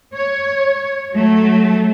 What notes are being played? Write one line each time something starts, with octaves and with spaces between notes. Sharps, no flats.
C#5
F#3 A3